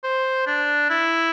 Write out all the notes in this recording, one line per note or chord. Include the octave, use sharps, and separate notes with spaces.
C5
D4
E4